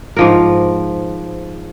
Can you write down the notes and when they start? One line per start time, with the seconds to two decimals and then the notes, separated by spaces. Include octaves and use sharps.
0.17 G#2 F3 A#4